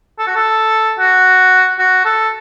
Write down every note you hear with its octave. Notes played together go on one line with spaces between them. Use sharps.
A4
F#4
A4
F#4
F#4
A4